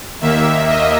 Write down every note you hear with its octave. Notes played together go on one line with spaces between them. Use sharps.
D#2 D#3 A#3 E5
D#5